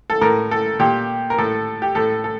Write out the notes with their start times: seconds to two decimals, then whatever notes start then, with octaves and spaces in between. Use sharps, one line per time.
0.10 A4
0.21 A2 A#4
0.51 A4
0.79 A#2 G4
1.30 A#4
1.38 A2 A4
1.82 G4
1.95 A2 A4
2.24 A4